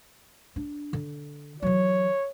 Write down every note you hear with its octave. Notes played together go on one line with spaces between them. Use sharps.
D4
D3
E3 F#3 C#5